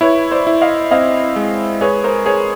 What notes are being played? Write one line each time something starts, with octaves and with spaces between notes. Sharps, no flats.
E4 B4 C#5
C5 D5
E4
D#5 F5
C4 D#5 F5
G#3
G#4 B4 C#5
A#4 C5
G#4 B4 C#5